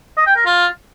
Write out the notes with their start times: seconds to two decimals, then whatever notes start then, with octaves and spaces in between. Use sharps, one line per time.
0.17 D#5
0.27 G5
0.36 A#4
0.46 F4